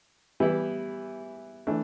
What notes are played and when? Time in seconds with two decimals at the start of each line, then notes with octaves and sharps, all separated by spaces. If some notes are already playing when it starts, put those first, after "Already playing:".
0.40 E3 G3 B3 E4
1.67 E3 A3 D4